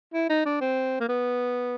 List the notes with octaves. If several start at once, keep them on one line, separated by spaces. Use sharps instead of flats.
E4
D#4
D4
C4
A#3
B3